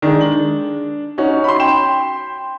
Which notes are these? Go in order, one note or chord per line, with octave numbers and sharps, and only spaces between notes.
D#3 G#3 D4
F#7
C#4 D#4 F#4
B5 C6
G5 E7